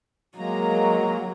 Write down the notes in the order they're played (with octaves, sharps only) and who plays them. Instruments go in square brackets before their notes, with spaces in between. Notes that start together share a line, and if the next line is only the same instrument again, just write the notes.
[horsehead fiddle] F#3 [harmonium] G#3 A#3 A#5